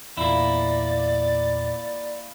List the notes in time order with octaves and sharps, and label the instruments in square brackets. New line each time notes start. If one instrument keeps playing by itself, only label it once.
[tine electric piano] E2 A#2 [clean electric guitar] A#3 E4 [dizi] D5